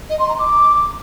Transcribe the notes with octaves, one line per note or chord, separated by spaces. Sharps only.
D#5
C6
A#5
D6